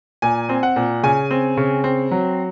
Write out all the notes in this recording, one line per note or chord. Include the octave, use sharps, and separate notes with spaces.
A#2 G#5
C4
F#5
A#2
C#3 G#5
C4
C#3
C4
F#3